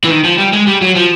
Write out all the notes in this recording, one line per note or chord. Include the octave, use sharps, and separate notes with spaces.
E3
D#3
F3
G3
G#3
G3
F#3
F3